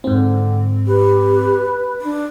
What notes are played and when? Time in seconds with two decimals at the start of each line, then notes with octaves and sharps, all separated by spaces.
0.04 G#2 D3 C4
0.87 G4 B4
2.01 D4